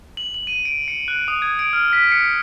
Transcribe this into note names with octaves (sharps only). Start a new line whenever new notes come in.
F#7
F#7
D#7
D7
C#7
F#6
D#6
G#6
D7
F6
B6
C#7